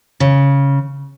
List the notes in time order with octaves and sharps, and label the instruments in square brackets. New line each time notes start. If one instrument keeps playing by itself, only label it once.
[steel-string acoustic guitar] C#3